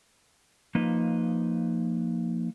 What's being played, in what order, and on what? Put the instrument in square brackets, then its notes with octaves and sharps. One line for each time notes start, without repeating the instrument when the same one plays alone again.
[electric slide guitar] F3 A#3 D#4 B4 D#5